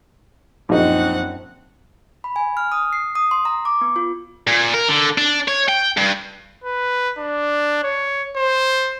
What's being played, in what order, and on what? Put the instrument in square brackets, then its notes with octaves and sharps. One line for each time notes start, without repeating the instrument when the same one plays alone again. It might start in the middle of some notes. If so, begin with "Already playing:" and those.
[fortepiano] A#1 D#4 [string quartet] F#2 C4 F#5
[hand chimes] B5
G#5
F6
D#6
C7
D#6
C6
A#5
D6
B3
F4
[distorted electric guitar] A#2
A#4
D3
D4
C#5
G5
G2
[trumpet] B4
D4
C#5
C5